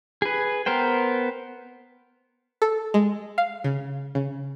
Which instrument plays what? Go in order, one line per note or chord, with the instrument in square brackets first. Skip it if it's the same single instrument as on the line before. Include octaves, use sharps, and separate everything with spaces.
[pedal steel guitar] G#4 B4
B3 A#4 C5 G5
[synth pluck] A4
G#3
F5
C#3
C#3